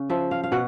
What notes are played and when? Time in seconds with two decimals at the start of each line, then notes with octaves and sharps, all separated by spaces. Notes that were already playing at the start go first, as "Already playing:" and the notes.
Already playing: C#3
0.10 F3 E5
0.31 F5
0.43 F5
0.52 B2 F#5